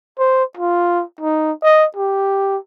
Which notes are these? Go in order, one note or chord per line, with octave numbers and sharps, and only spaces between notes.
C5
F4
D#4
D#5
G4